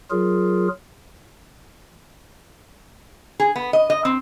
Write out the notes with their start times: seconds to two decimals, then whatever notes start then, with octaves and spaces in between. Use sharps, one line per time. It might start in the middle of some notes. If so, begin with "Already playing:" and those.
0.11 F#3 F4 G#4 A#4
3.40 G#4
3.56 B3
3.73 D#5
3.90 D#5
4.05 C4